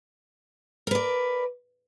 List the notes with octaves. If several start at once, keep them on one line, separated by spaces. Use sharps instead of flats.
A#4 B4 D5